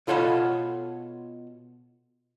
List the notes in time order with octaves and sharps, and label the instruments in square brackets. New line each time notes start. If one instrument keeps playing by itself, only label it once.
[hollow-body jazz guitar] B2 F4 A4 C#5 F#5 B5